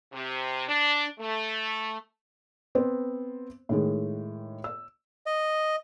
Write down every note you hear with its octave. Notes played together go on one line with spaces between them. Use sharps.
C3
D4
A3
B3 C4 C5
A2 D#3 G#3
E6
D#5